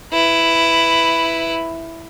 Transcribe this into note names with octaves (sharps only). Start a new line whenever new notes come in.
E4 B4